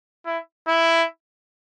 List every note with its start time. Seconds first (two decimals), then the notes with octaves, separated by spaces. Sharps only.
0.26 E4
0.68 E4